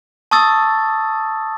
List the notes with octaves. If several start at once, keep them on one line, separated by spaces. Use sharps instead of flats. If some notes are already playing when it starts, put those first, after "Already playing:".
A5 C#6 D#6 E6 A6